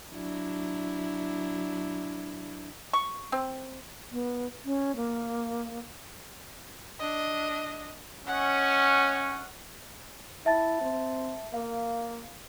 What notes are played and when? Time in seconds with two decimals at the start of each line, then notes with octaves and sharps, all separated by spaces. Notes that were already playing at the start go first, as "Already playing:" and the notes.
0.12 F#3 D4 E4
2.93 C#6
3.32 C4
4.12 B3
4.65 C#4
4.96 A#3
6.99 D4 D#5
8.26 C#4 D#5 F#5
10.46 E4 E5 A5 A6
10.81 C4
11.54 A#3 F5